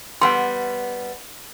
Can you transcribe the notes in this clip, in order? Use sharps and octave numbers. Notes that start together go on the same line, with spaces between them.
G3 B3 F#5 C6